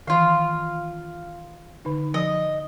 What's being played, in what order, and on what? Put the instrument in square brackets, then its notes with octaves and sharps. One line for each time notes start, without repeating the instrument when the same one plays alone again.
[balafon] D#3 E3 [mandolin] F4 F5
[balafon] D3 D#4
[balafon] F3 [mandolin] D#5